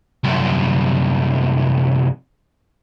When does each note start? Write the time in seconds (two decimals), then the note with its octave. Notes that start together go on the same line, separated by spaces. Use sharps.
0.24 C2 F#2